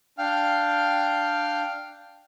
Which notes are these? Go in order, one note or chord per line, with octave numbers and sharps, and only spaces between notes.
D4 F5 G5 F6